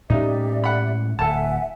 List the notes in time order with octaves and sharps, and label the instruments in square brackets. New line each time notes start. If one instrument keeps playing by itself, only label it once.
[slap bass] A2 G#3 C#4 [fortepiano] D#4 [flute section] G4 D5 E5
[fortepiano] F#5 B5
[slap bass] D1 [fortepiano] A4 A5 [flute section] E5 F#5 G#5